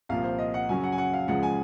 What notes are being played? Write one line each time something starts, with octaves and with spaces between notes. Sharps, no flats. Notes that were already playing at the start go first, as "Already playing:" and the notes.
C2 A#2 F3 F5
C5
D#5
F#5
F#2 C#3 F#3 C#4 G#5
F#5
G#5
F#5
F5
C#2 C#3 F3 G#3 F#5
G#5